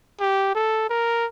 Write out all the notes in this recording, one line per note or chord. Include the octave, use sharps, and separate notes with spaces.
G4
A4
A#4